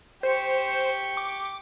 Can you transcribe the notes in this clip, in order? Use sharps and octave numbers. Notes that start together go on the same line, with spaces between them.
G4 C5 C#6
D6